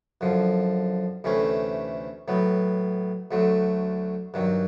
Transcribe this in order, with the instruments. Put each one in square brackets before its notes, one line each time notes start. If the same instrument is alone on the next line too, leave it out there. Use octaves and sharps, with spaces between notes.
[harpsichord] F#2 D3 F3
D2 C3 E3 A3 C#4
A2 F#3 B3
D2 D3 F#3 A3
G2 D#3 F#3